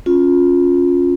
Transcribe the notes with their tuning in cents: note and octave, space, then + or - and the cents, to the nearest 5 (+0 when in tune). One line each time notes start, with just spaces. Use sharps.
C#4 -5 F4 +15